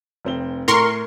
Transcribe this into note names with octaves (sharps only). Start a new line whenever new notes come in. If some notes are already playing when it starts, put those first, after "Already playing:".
F1 C4 G7
A2 A#4 C6 C#6